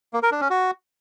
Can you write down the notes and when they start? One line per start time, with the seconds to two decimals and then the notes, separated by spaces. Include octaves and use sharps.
0.13 A#3
0.23 A#4
0.32 D4
0.41 C#4
0.50 F#4